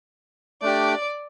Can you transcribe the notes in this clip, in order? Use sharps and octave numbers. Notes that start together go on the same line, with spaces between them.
A3 D4 G4 D5